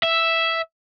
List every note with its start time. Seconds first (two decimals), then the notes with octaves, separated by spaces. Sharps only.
0.03 E5